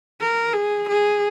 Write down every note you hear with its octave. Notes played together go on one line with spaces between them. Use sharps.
A#4
G#4
G#4